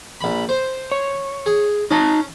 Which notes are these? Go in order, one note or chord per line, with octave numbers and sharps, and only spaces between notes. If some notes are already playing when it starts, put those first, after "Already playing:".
A#1 B5
C5
C#5
G#4
C#4 D#4 A5 A#5